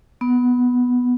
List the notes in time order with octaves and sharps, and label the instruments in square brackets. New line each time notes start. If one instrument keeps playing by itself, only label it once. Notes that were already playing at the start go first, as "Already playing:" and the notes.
[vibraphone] B3